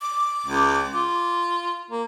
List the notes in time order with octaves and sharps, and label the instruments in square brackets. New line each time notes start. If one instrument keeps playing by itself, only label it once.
[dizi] D6
[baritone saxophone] C#2
F4
A#3